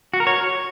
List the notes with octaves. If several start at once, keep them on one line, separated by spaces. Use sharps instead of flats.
F#4
A#4
C#5